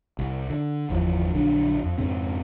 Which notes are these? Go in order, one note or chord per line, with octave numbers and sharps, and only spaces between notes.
C2
D3
G1 E2 F3
A#1 D3 F#3 D4
F2
F2 G#2 C#3 C4